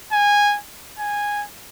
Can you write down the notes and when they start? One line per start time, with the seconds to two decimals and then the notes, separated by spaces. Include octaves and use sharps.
0.12 G#5
0.99 G#5